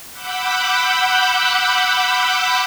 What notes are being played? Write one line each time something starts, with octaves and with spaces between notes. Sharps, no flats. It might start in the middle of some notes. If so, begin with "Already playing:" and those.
F#5 B5 D6 E6 F#6 G6